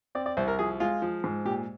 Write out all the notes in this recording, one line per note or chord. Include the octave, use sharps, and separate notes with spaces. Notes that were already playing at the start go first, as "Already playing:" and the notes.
C4 D5
D5
C2 C5
A#4
F3 G#4
G#3 F4
F3
G#2
A#2 G4